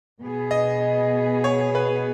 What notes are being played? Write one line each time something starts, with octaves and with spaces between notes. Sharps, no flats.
B2 B3 G#4
D#5
C#5
B4